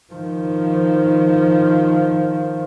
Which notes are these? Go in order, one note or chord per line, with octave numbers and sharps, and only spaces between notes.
D#3 F3